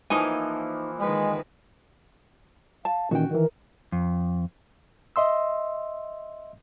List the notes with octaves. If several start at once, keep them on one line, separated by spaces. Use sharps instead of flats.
E3 F3 A#3 D#4 G#5
D#3 G#3 B4
F5 A5
A#2 D#3 E3 C#4 F#4 G5
D#3 E3 A#4
F2
D#5 E5 C6 E6